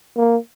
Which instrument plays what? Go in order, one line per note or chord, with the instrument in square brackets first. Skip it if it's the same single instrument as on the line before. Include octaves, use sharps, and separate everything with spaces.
[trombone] A#3